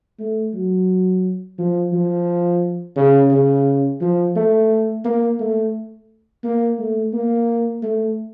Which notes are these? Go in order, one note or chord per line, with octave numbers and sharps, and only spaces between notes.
A3
F#3
F3
F3
C#3
C#3
F3
A3
A#3
A3
A#3
A3
A#3
A3